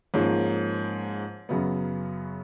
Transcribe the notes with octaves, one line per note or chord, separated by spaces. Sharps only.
G#2 F3 A#3 C#4
F#2 C#3 F#3 B3